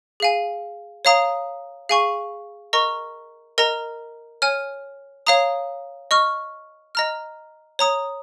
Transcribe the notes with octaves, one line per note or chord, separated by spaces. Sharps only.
G#4 F5 G#5
C#5 F5 A#5 D#6
G#4 F5 G#5 C#6
A#4 D#5 A#5 C#6
A#4 D#5 A#5
C#5 G#5 F6
C#5 F5 A#5 D#6
D#5 C#6 F6
D#5 A#5 F6
C#5 A#5 D#6